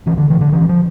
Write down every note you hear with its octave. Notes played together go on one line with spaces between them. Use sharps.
A#1 E3
D3
A#2 E3
D3
A#1 E3
F3